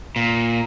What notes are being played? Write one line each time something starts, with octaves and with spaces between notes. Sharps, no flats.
A#2